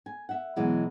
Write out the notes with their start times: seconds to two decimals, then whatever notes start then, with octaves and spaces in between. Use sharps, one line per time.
0.06 G#5
0.29 E5 F#5
0.56 B2 E3 F#3 G#3